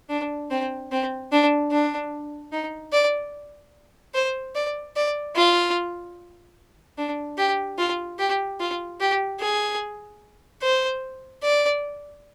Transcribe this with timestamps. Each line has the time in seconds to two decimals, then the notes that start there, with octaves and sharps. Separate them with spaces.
0.10 D4
0.51 C4
0.92 C4
1.32 D4
1.71 D4
2.52 D#4
2.93 D5
4.15 C5
4.55 D5
4.96 D5
5.36 F4
6.98 D4
7.38 G4
7.78 F4
8.19 G4
8.60 F4
9.00 G4
9.40 G#4
10.62 C5
11.43 D5